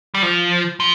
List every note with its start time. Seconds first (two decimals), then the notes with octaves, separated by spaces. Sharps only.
0.15 G3
0.22 F3
0.80 F3